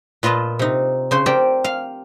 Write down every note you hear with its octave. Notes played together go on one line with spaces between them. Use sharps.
A#2 F4 B4 D#5 A5
C3 D#4
C#3 C5 C6
C4 G4 A#4 D5
F5